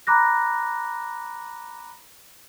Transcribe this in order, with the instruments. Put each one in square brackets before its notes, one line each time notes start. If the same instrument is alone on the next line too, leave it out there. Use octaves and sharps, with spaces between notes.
[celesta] A#5 B5 D6 F#6 A#6